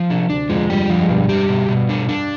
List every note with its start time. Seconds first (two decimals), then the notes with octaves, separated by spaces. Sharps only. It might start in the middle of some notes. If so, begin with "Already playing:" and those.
Already playing: F3
0.10 C3 D4
0.30 D2 D3 D4
0.49 F2 F3 G#3
0.69 G2 G3 G4
0.90 G2 F3 G3
1.00 G#3
1.09 G2 B2 G3
1.29 G4
1.49 B2
1.69 B2
1.89 D4
2.09 D4